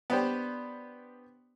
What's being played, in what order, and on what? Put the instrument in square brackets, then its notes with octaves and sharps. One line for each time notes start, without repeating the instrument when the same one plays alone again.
[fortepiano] B3 D4 G4 B4 C5